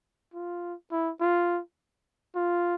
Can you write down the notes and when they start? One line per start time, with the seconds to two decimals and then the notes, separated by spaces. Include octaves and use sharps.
0.34 F4
0.91 E4
1.21 F4
2.35 F4